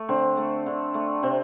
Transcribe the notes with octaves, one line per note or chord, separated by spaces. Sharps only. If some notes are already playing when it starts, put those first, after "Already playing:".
Already playing: A3
D3 C4
A3
D3
A3
C3 C4